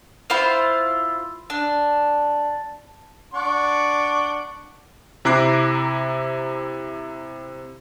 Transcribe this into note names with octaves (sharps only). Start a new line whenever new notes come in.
E4 F4 C5 F5
D4
D4 F#5 C#6
C3 E4 A#5 D6 F#6 C7